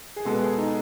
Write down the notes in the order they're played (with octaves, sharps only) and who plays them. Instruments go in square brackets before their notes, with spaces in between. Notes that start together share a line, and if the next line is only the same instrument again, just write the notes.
[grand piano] G#4
B2 G#3 B3 A4
G#4
D#4